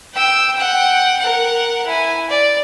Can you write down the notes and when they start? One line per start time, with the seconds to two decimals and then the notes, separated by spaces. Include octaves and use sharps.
0.14 G5 E6
0.55 F#5 G5
1.20 A#4 F#5
1.86 E4 G#5
2.29 D5